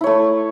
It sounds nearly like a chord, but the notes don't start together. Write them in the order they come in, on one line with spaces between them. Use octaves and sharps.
E4 C#5 A3